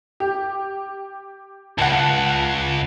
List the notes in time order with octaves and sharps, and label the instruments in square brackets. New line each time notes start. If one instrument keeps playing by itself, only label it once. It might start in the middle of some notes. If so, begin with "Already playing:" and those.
[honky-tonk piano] G4
[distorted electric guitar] C#2 [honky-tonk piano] F#5 A5